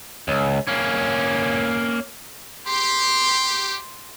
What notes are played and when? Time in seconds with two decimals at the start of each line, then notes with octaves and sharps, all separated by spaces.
0.28 C#2
0.67 A#3 C#4
2.67 G4 C6